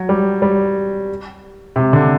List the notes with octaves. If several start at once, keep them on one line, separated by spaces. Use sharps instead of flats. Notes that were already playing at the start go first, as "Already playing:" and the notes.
Already playing: F#3
G3
G3
C3
D3